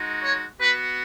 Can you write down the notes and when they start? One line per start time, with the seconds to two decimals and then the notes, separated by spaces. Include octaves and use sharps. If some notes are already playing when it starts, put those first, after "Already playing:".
Already playing: G#3 D#4 F#4
0.24 C#5
0.60 B3 F#4 B4